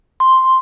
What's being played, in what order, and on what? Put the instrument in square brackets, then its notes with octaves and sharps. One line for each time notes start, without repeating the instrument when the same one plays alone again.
[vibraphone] C6